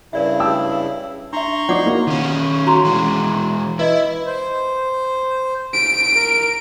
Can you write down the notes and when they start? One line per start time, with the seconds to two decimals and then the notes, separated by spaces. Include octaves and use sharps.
0.13 G2 C#3 E4 A#4 D5 E5
0.40 G5 A5 E6
1.33 D4 E5 A#5 C6 C#6
1.69 F3 D#4 C#5 D5 F#5 D6
1.86 A#3 E4 F#4
2.07 D#3 C#4
2.66 F#4 A#5 C6
2.85 E3 G#3
3.79 E4 B4 D#5
4.27 C5
5.74 D7
6.15 A#4